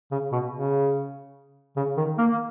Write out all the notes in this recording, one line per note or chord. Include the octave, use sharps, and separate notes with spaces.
C#3
B2
C#3
C#3
D#3
A#3